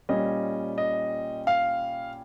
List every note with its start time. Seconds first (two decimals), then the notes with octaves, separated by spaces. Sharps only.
0.09 A#2 G3 C#4 D#5
0.78 D#5
1.47 F5